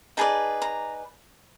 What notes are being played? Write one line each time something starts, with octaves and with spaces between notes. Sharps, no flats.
D#4 G#4 B4 D5 A5
A#5